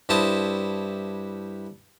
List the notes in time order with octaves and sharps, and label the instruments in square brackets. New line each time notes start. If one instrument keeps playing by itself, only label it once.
[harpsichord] G2 E4 C5 A5 D#6